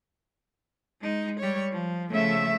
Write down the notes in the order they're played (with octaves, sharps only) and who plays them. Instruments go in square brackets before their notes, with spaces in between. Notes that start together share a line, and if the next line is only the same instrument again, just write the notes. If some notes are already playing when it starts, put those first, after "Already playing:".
[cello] G#3 D#4
G3 C#5
F3
[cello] C#3 F3 [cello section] A3 E5